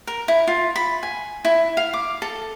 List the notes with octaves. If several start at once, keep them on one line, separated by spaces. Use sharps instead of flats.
A#4
E4
F4
B5
G#5
E4
F5
D6
A4